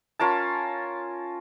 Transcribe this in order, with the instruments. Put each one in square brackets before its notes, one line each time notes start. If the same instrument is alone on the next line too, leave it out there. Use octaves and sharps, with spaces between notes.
[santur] C#4 F4 A#4 A5